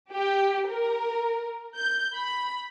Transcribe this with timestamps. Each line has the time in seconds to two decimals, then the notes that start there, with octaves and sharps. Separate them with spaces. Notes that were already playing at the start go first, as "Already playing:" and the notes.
0.13 G4
0.69 A#4
1.76 G6
2.15 B5